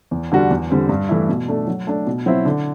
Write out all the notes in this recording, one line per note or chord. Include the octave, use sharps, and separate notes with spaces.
E2
D3 G3 D4 F#4
E2
D3 G3 C4
G2
E3 A3 E4
B2
A3 D4 A4
F#3
A3 D4
B2
F#3 C4 E4
D3